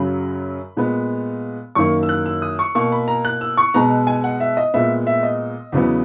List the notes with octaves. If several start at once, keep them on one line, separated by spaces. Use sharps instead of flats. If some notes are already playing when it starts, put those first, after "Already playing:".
Already playing: F#2 C#3 F#3 B5
A#2 G#3 B3
F#2 D#3 A#3 C#6
E6
F#6
E6
D#6
C#6
B2 A#3 C#6
B5
A#5
F#6
E6
C#6
B2 G#3 B3 A#5
G#5
F#5
E5
D#5
A#2 G#3 B3 E5
E5
D#5
E2 C#3 F#3 B3